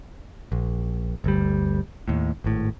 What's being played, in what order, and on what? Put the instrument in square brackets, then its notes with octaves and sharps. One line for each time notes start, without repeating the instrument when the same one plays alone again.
[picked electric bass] A#1
G1 D2 G3
D#2 A2
G#1 A2